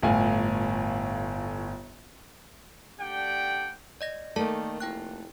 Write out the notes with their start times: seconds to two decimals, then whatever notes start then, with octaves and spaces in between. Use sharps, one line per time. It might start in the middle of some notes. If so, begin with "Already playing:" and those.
0.03 G1 A2 F4 G#5
3.00 A3 D4 G4 D5 F#5 G5
4.01 D5 D#5 A#6
4.36 D#3 A3 A#3 A4 D5 A5
4.80 F1 E4 G5 F#6